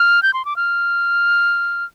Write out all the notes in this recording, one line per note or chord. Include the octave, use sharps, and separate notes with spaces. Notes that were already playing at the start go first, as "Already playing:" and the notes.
Already playing: F6
G6
C6
D6
F6